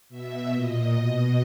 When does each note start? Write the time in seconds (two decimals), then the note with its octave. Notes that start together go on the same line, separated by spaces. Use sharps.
0.09 B2 E5
0.52 A#2 D#5
0.95 B2